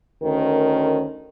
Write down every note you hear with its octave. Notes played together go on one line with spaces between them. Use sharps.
D2 D#3 C#4 A#4